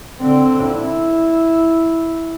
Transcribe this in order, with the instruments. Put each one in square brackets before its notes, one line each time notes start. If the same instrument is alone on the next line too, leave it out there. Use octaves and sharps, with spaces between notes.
[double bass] D3 C4
E4